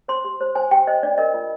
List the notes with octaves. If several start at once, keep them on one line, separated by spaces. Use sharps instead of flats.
C5 C6
G4
C5
C5 G#5
G4 G5
C5 D#5
D4 D5
A#4 D#5
F4